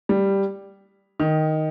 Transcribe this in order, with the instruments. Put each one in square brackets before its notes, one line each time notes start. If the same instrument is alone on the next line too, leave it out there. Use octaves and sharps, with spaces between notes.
[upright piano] G3
D#3